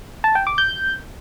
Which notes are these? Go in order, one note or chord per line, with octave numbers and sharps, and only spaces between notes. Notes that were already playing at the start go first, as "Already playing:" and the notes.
A5
G5
D6
G6